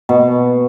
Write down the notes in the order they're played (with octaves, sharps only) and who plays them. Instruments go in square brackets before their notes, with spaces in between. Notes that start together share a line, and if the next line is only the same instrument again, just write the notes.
[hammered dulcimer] B2